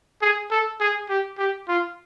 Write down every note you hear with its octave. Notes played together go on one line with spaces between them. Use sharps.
G#4
A4
G#4
G4
G4
F4